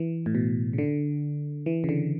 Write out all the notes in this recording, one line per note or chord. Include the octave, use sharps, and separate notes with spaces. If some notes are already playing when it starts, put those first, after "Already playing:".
Already playing: E3
A2
B2
C#3
D3
E3
C#3
D3